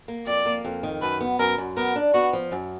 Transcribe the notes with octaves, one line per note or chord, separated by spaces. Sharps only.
A#3
F2 D5
A#3
F2
D#3
F#2 B4
B3
F#2 A#4
F#2
B3 A#4
D4
B3 F#4
F3
F#2